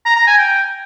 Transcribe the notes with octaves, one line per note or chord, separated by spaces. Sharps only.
A#5
A#5
G#5
G5